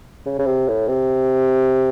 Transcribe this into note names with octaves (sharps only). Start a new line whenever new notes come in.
C#3
C#3
C3
A2
C3